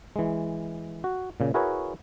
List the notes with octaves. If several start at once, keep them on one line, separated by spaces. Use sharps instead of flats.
E3 G#3
F#4
A#2 C#3
E4 F#4 G#4 A#4 B4 C#5